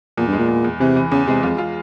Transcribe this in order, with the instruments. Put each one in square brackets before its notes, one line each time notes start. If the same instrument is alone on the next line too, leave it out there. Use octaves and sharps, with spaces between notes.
[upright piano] E2 [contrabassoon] A#2
[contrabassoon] G2
[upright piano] G#3
[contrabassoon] A#2
[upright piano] E2
E2
[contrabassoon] C3 [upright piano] E3
[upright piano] E3
[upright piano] E2 [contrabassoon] C#3
[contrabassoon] C3 [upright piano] G#3
[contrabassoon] F2 [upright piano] F4
[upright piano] F4